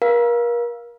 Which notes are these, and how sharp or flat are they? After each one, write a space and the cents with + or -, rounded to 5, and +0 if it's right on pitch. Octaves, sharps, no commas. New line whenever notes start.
A#4 +35 F5 +0